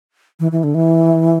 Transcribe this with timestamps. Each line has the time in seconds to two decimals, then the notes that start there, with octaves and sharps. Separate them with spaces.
0.40 E3
0.52 E3
0.64 D3
0.75 E3